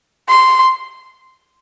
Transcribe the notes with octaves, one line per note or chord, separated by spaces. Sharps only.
C6